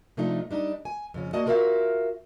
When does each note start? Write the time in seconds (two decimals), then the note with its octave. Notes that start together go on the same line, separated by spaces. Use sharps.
0.17 C3 F3 A3 D4 D#4 F4
0.51 G3 D4 D#4
0.85 G#5
1.14 F2 C#3 C#4
1.33 A#3 F#4 D5 D#5 F#5 A5
1.46 F4 F#4 A#4 C#5 E5 F5